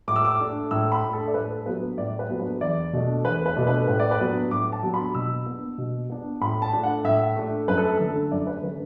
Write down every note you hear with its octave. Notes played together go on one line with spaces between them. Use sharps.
A2 D6
E6
D6
A3 D4
A2 E6
B5
A3 D4
A4
D5
A2 B4
A4
F#3 B3 D4 B4
A2 D5
B4
F#3 B3 D4
B4
E2 D5
B2 A3 D4
E2 B4
B4
B2 A3 D4
B4
A2 B4
D5
B4
F#3 B3 D4
A2 D6
A5
F#3 B3 D4
B5
B2 E6
B3 D4
B2
B3 D4
A2 B5
A5
A3 D4
F#5
A2 E5
A3 D4
F#2 B4
A4
D3 A3 D4 A4
F#2 D5
B4
D3 A3 D4 B4